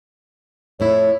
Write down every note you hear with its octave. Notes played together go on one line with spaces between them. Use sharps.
F2 A2 E4 C#5